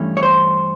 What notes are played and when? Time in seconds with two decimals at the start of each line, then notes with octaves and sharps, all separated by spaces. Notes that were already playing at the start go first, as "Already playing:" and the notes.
Already playing: G2 E3 A3 C#4
0.17 C#5
0.23 C5